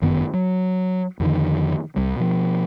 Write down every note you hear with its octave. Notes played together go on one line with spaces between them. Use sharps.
G1 F#2 D#3 B3
F#3
F2 D3 D#3
C2 G3
B2 F3